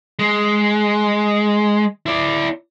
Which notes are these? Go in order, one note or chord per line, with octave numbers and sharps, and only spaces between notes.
G#3
E4 D5